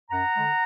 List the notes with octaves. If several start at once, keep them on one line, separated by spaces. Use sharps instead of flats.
F#2 F#5 A#5
D3 G#3